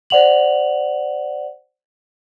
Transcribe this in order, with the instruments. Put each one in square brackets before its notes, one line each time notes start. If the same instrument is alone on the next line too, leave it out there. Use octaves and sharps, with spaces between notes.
[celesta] C5 D5 F#5 F7 F#7